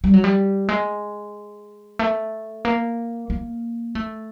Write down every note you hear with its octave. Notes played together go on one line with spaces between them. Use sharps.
G3
F#3
G3
G#3
A3
A#3
A#3
A3